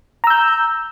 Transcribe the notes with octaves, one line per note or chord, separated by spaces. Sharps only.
A#5 E6 G6